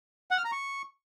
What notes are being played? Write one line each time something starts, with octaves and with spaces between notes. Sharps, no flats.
F#5
F6
A#5
C#6